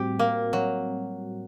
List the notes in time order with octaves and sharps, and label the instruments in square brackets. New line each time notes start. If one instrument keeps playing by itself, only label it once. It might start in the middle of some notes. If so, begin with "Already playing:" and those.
Already playing: [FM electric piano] A2 G3 C4 F#4 [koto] G4
[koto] A#3
F#3